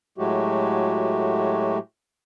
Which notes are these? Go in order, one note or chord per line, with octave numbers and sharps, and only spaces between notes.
A2 F#3 G#3 A3 F#4 G4